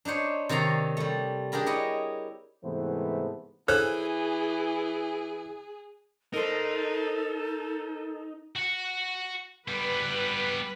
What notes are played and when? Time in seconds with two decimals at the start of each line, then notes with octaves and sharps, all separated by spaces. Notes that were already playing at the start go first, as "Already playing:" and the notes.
0.05 D4 D#4 C5 C#5
0.49 C3 D#3 C#5 D5 A#5 C6
0.97 G3 A3
1.52 D4 G4 G#4 A#4 B5
1.66 E4 C#5 D#5
2.63 G#2 C3 E3 A3 B3 C5
3.68 E3 G#4 A4 C5 C#5 F#6
6.33 D#4 A4 A#4 C5
8.56 F#4 F#5
9.68 G3 B3 B4